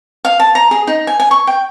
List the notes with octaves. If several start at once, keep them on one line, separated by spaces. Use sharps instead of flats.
F5
A5
A#5
G#4
D#4
G#5
G#5
C#6
G5